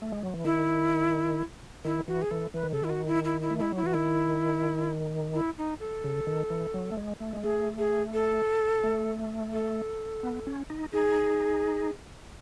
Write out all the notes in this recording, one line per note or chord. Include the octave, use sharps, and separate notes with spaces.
A3
G#3
F#3
E3
D#3 E4
D#3 E4
E3 F#4
G#4
E3 A4
E3 B4
D#3
C#3 A4
D#3 E4
F#4
E4
E4
E4
A3
G#3 E4
F#3 E4
E3 F#4
D#3 E4
E4
D#4
A4
C#3
D#3
E3
F#3
A3
G#3
A3
G#3
A3 G#4
G#4
A4
A3
A4
B3
C#4
D#4
D#4 G#4